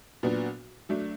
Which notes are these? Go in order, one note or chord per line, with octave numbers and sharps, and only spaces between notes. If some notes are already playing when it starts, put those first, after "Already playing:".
A#2 F#3 B3 D4 F#4
F#3 A3 D4